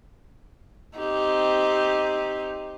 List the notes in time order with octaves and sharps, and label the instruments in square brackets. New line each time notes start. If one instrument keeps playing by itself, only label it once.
[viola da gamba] C4 D#4 G4